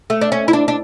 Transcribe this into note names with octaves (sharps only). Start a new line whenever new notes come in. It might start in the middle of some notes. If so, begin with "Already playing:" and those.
A3
D4
C#4
E4
D4
D4